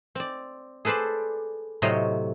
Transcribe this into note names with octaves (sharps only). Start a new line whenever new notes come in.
C4 D5
G#4 A4 B4 C5 D5
A2 C3 F#3 C#5 D#5 C6